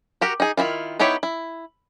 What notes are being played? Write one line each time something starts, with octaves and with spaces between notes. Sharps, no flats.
F#4 G4 A#4
D#4 G#4
D#3 E3 E4 F4
B3 D#4 E4 G4 C#5
E4